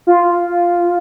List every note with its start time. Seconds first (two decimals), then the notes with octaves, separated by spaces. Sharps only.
0.07 F4